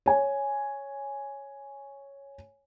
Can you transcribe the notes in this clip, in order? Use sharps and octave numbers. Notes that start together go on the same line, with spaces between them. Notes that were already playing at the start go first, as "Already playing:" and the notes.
C#5 G#5